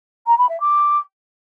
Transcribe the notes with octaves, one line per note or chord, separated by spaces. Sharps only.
A#5
B5
E5
D6